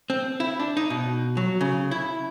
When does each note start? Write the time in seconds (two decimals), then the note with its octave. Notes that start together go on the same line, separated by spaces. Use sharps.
0.10 C4
0.40 E4
0.60 D4
0.77 D#4
0.90 B2
1.37 F#3
1.61 C#3
1.91 E4